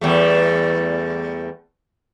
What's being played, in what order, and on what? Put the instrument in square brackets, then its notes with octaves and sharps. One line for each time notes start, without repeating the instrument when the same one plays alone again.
[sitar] E2 G3 A3